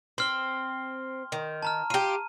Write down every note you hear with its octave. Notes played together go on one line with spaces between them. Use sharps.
C4 C6 F6 G7
D#3
A5 A#5 F6
F4 G4 D#7